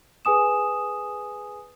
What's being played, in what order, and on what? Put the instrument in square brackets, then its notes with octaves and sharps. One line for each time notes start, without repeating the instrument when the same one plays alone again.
[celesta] G#4 B4 G#5 D#6 E7